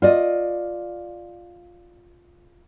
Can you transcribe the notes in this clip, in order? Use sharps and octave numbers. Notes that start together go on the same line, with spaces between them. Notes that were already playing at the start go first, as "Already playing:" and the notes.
F4 D5 D#5